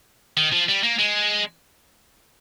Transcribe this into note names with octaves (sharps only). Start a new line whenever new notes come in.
D#3
F3
G3
A#3
G#3